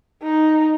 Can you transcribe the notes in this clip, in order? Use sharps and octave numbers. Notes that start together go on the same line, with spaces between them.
D#4